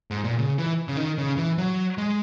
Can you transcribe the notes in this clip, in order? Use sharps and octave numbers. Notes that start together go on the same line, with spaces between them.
G#2
A#2
C#3
E3
C#3
D#3
C#3
E3
F#3
G#3